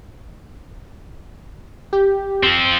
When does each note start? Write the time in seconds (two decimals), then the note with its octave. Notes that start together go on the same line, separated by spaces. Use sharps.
1.93 G4
2.43 F3 C4